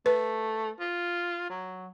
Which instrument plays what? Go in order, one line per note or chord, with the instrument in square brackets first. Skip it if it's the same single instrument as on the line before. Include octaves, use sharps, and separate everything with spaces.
[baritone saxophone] A3 [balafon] B4
[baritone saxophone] F4
F#3